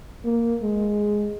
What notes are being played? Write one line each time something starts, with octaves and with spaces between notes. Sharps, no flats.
A#3
G#3